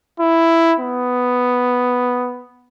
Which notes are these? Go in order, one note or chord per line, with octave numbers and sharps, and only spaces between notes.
E4
B3